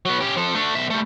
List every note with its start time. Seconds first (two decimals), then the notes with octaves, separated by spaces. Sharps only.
0.05 F#3 B3
0.21 C#4 G4
0.36 F3 A4
0.55 A3 D4
0.75 B1 E5
0.90 G3 A3